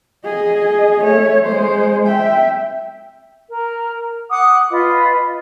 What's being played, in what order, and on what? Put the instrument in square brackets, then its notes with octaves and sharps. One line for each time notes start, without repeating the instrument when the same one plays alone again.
[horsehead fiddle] G#4 D#5
A3 C#5
G#3 C5
E5 G5
[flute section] A#4
F#5 D6 D#6 F#6
F4 B4 D#5